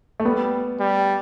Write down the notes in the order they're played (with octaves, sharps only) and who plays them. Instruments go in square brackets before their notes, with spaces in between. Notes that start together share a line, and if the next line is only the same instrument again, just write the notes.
[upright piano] A3
[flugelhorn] G3 [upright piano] B3
[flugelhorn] G3